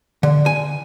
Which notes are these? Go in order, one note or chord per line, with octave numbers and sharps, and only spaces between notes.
D3
G#5